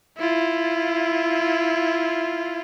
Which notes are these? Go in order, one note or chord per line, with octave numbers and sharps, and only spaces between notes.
E4 F4